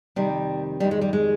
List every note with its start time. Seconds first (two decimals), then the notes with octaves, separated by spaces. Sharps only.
0.16 F2 C3 D#3 G3
0.80 F2 D#3 G3
0.91 G#3
1.01 G3
1.13 G#3